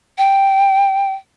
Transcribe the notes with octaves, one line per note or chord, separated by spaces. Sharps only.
G5